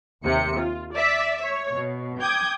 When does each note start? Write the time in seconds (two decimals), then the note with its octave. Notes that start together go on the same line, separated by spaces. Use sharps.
0.24 D#2 C3 C#7
0.59 F4
0.93 D5 E5
1.43 C#5
1.72 B2
2.20 G5 D6 D#6 G6 G#6